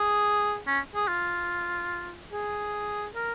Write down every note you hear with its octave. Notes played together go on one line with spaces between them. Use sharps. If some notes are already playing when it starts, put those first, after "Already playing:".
Already playing: G#4
C#4
G#4
F4
G#4
A#4